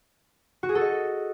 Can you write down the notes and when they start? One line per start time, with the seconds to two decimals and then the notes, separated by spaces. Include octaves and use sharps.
0.63 F#4
0.69 G#4
0.75 A4
0.81 D#5